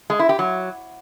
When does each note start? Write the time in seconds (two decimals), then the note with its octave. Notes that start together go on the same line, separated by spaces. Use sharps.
0.10 G#3
0.19 E4
0.29 G4
0.39 F#3